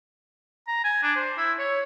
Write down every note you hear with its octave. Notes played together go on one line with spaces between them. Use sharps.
A#5
G#5
D4
C5
E4
C#5